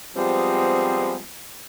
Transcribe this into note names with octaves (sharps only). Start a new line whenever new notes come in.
F3 G3 G#3 B3 C4